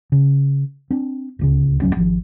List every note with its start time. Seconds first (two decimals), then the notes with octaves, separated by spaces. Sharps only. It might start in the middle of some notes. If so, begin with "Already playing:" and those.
0.12 C#3
0.90 C4 D4
1.39 D1 C#2 C#3
1.82 D1 F#2 F#3 C#4
1.97 G#1 F3